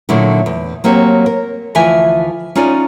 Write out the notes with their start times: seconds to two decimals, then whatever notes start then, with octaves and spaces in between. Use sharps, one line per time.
0.09 A#2 D3 F#3 A3 D#4 E4
0.46 E2
0.84 F#3 A#3 C4 G4 C#5
1.26 A#4
1.75 D2 E3 F3 E5 G#5
2.56 C#4 D#4 F4 G#4 D5